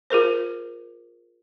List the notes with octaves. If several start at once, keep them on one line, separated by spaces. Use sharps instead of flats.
F4 G#4 A#4 C5